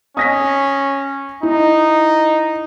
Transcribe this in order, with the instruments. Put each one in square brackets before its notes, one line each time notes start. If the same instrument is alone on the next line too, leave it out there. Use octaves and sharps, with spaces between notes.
[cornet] C#4 [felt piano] D#6 A#6 B6
[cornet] D#4 [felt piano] E4